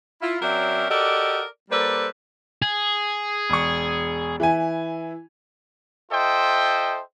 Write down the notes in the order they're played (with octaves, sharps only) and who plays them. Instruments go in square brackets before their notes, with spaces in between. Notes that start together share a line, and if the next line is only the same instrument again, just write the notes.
[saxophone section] E4 F4
F#3 C4 C#4 A#4 D5 E5
F#4 G4 A4 A#4 D5 D#5
G3 A#3 A4 B4 C5 D5
[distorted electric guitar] G#4
[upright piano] E1 C#6
E3 E4 G#5
[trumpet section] F4 A4 C5 D#5 E5 G5